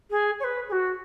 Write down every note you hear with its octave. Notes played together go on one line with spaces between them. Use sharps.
G#4
C#5
B4
G#4
F#4